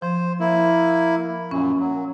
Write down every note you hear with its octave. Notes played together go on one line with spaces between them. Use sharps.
F3 C5
A#3 E4
F#2 A#2 C#4
F#3